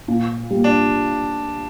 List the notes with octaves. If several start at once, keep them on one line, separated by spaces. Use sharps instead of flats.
A#2
G3 A#3
D4